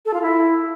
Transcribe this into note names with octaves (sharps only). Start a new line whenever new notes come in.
A4
F4
E4